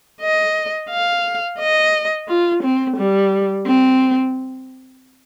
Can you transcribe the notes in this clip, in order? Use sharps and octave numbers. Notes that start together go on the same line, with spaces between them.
D#5
F5
D#5
F4
C4
G3
C4